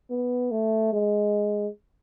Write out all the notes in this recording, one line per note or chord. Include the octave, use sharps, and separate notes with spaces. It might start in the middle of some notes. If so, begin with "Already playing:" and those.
B3
A3
G#3